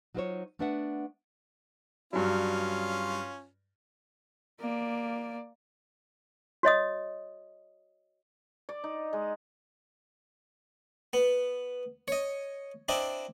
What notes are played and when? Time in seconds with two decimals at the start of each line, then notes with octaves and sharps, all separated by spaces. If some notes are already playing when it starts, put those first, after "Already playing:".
0.14 F#3 D#4 F4 A#4 C5 C#5
0.59 A3 B3 D4 B4 E5 F#5
2.13 G2 F#3 C#4 F4
4.60 A#3 D5
6.63 F#4 C#5 D#5 D#6
8.69 D5
8.84 D#4
9.13 G#3
11.13 B3
12.08 C#5 D#5
12.89 C4 D4 E4 D#5